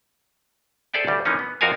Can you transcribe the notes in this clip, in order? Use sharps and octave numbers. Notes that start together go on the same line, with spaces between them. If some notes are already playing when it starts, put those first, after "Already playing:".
G#4 A4 C5 D5 E5 G5
D2 G3
E3 F3 A#3 C#4 D#4
B3
F2 F3 F#4 A#4 F5 G#5